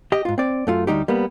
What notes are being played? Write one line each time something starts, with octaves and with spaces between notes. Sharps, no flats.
G4 D#5
G#2 F4
C4 D5
F#2 A3 F4
D2 G3 D#4 G4
G3 A#3 B3